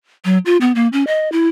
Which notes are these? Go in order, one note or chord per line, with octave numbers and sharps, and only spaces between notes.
F#3
F4
B3
A#3
C#4
D#5
E4